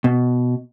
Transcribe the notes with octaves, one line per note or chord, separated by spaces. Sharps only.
B2